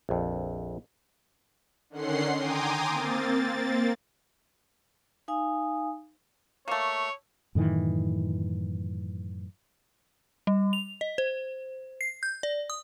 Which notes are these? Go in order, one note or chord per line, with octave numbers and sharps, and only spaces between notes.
A#1 F2
D3 D#3 C#4 F#5 C6 C7
G5 G#5 A#5 C6 D6 D#6
A#3 C4 A6
D#4 F5 G#5 D#6
A3 A#3 C#5
F#2 A2 D#3 E3
G3
F7
D#5
C5
C7
G6
D5
D#6